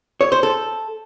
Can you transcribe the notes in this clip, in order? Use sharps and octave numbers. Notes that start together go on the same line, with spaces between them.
C#5
C5
A4